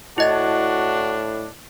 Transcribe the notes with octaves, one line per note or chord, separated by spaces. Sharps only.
A2 D4 E4 F#4 D#5 A6